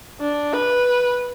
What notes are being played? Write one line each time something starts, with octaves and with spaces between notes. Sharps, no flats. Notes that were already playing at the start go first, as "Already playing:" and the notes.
D4
B4